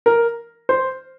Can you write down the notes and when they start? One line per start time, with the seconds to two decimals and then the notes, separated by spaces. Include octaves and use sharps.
0.06 A#4
0.69 C5